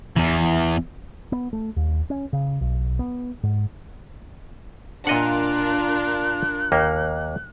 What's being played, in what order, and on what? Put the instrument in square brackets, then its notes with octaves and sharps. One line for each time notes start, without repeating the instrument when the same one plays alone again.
[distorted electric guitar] E2 E3
[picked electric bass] B3
A3
D#2
C#4
C#3
B1
B3
G#2
[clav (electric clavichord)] A#2 D#5 F#5 [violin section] D4 F4 A#4 [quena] F#6
[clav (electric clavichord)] D#2 A#3